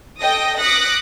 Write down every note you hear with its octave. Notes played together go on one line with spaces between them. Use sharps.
A4 D#5 G5 D#6 A#6
D6 D#6 F#6 A#6 B6 C#7